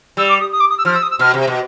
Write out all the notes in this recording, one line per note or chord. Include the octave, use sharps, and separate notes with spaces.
G3 E6
D6
D#6
D#6
D6
D#6
E6
F3 F6
E6
D#6
E6
B2 F6
C3
B2